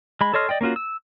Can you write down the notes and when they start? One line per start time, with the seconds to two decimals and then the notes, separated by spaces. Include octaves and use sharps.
0.21 G#3 B5
0.34 A4 C#5 D#5 C6 F6
0.49 D5 D#5 G5
0.61 A#3 C#4 F4 F#4
0.76 E6